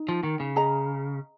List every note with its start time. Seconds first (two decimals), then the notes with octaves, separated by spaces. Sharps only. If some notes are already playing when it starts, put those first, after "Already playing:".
Already playing: D#4
0.09 F3
0.23 D#3
0.40 C#3
0.56 G#4 D#5 A#5